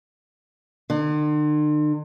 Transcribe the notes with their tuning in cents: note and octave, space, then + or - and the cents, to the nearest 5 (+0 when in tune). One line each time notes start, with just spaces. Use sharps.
D3 +45